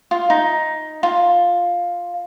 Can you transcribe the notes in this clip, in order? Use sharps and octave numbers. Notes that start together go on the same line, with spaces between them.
F4
D#4
F4